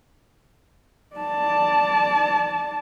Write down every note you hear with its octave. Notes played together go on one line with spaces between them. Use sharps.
D5 A5